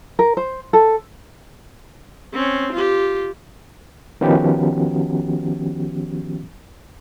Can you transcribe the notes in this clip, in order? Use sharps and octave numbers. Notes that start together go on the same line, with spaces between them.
A#4
C5
A4
C4 C#4
F4 G4
D#3 F3 B3 C#4 F#4 G4